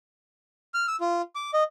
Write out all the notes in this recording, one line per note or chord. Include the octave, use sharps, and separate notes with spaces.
F6
E6
F4
D6
D#5